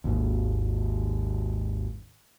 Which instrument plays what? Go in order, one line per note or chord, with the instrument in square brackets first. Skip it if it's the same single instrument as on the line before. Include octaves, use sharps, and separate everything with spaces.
[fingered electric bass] G#1 D#2